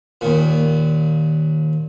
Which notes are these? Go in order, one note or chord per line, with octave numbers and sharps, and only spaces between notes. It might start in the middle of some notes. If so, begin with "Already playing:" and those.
D#2 A#2